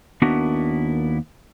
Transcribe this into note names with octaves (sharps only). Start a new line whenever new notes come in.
D#2 B3 D4 E4 F#4 A#4